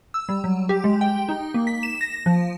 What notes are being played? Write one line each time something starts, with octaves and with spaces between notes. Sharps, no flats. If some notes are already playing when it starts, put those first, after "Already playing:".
E6
G3
F#3
G4
G#3
G5
D#4
A#3
B6
E7
A#6
F3